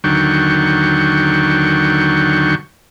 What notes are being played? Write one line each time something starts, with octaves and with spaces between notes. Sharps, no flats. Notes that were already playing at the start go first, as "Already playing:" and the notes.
D#2 D3 F#3 G5 C#6